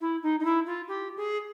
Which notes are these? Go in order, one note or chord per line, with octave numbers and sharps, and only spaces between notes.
E4
D#4
D#4
E4
F4
G4
G#4